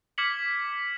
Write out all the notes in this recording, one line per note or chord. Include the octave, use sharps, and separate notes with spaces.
D6 F6 G#6 B6 C#7 F#7